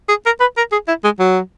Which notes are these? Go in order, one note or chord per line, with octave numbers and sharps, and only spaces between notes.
G#4
A#4
B4
A#4
G#4
E4
G#3
F#3